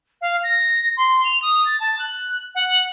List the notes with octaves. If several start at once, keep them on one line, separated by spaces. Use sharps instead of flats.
F5
A#6
C6
F7
D#6
A6
A5
F#6
F#5